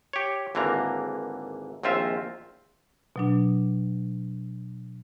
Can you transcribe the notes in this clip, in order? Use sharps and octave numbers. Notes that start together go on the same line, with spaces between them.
G4 C#5
G#1 D3 E3 A#3 A#5
A#1 D#2 C4 F4 E5
B2 F#3 D4